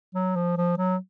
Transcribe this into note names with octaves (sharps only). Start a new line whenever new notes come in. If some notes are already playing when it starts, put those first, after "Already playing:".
F#3
F3
F3
F#3